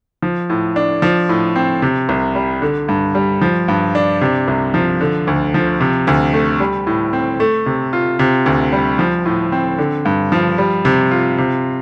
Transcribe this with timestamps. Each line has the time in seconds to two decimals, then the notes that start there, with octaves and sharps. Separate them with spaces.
0.22 F3
0.50 A2
0.76 D4
1.02 F3
1.29 A2
1.56 C4
1.82 C3
2.09 C2
2.35 G3
2.62 D3
2.88 G2
3.15 G3
3.42 F3
3.68 G2
3.95 D4
4.21 C3
4.48 C2
4.74 F3
5.01 D3
5.27 D2
5.54 F3
5.81 C3
6.07 D2
6.34 A3
6.60 G3
6.87 A2
7.13 C4
7.40 A3
7.66 C3
7.93 F4
8.19 C3
8.46 D2
8.73 G3
8.99 F3
9.26 A2
9.52 C4
9.78 D3
10.05 G2
10.32 F3
10.58 G3
10.85 C3
11.11 F4
11.38 C3